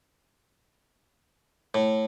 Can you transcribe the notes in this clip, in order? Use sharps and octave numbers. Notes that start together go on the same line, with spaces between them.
A2